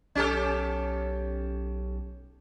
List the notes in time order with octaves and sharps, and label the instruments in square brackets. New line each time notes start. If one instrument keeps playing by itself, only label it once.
[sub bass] B1 [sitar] C#4 G4 A4